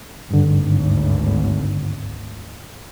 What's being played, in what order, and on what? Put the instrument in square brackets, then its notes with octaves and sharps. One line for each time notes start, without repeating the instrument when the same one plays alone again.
[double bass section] G#1 D2 [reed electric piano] G2 D3